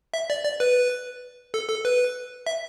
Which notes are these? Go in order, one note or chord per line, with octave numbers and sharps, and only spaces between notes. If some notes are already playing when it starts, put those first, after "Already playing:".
E5
D5
D5
B4
A4
A4
B4
E5